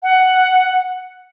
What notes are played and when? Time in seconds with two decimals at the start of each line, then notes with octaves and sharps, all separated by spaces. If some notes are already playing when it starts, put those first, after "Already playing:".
0.03 F#5